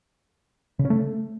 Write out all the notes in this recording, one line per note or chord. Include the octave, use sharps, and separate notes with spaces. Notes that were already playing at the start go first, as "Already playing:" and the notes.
C#3
C#4
A3